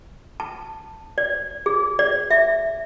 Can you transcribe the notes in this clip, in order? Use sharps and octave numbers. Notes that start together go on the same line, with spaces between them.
A5
D5
G#4
D5
E5